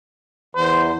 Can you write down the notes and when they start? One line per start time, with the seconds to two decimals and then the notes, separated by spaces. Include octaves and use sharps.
0.55 E2 C5